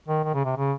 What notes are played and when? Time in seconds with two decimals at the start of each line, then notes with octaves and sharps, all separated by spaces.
0.08 D#3
0.24 D#3
0.34 C#3
0.45 C3
0.56 C#3